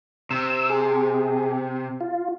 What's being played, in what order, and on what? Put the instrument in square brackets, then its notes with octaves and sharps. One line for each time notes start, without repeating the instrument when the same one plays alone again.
[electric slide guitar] C3 [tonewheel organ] E6
[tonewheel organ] G#4
F4